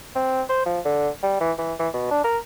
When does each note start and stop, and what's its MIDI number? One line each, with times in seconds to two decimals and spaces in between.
0.16 0.42 60
0.49 0.65 72
0.66 0.80 53
0.85 1.09 50
1.23 1.36 55
1.41 1.52 52
1.59 1.74 52
1.80 1.89 52
1.94 2.06 47
2.11 2.24 62
2.24 2.38 70